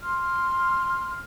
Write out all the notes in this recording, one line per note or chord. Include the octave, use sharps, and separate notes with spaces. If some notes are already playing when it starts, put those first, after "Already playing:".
C6 F6